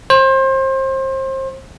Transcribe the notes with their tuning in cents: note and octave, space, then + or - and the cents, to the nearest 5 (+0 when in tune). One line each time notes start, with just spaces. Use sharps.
C5 +30